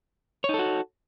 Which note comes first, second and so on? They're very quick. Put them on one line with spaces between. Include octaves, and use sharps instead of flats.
C#5 D#4 A4 F#4